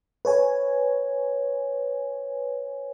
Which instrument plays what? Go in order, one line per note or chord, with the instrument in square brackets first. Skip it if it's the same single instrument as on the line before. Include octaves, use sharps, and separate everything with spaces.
[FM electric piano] B4 C#5 G#5